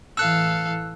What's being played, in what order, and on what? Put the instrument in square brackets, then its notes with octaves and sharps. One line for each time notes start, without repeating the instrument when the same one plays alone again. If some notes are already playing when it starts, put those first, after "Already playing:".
[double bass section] A2 E3 [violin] A4 F5 [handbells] E6 F#6